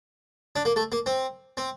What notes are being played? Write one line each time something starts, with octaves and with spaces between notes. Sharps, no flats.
D4
A#3
A3
A#3
C4
C4